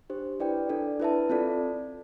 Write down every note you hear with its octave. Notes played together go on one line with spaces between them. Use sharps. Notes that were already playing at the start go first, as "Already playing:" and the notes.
D4 G4 C5
E4 B4 D5 G5
D4 A4 D5
E4 B4 E5 A5
C4 F4 A4 D5